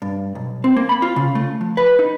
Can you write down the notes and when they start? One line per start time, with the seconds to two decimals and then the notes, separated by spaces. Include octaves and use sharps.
0.02 G2
0.35 B1
0.64 C4
0.76 A#3
0.89 B5
1.02 F4
1.16 C#3
1.35 A3
1.61 F3
1.77 B4
1.99 D#4